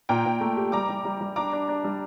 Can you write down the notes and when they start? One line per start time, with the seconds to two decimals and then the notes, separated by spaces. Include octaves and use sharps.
0.09 A#2 G5 A#5
0.25 A#2
0.40 A3
0.57 G4
0.72 G3 A#5 D6
0.89 G3
1.05 G3
1.21 G3
1.36 D4 A#5 D6
1.52 D4
1.68 D4
1.84 G3